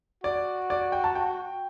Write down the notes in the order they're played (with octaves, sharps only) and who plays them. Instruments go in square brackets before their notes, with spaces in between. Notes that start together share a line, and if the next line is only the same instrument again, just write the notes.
[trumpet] F#4 [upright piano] D5
[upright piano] D5
G5
A5
G5